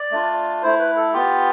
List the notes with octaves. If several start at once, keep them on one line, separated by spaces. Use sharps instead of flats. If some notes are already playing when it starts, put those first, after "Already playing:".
Already playing: D5
A3 D4 F4
A3 E4 C5
B4
A4
B3 F4 G4